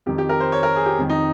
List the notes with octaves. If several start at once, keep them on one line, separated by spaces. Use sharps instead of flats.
F2 D#3 G4
G4
A#4
C5
C#5
A#4
G#4
G4
F2 D#3
D#4